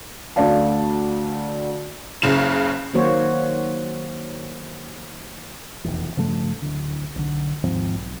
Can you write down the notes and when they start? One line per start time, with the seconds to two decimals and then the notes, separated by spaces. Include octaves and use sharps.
0.36 D2 A3 D4 D5 F5 A5
2.22 F#1 C#3 E7
2.94 D#3 F#3 A#3 F#4 C5 C#5
5.84 F1 B1 E2
6.17 G2 C#3 F3 A3
6.62 D1 D3
7.15 B1 D3
7.63 D#2 G#2 F3 C4
7.95 B1